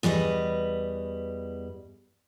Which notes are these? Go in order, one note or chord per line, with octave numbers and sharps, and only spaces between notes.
E2 G3 B4 D#5